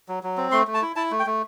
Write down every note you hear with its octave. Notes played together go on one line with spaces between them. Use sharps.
F#3
F#3
C4
A3 C6
A3
A5
E4
E4 A5
A3
G5
A3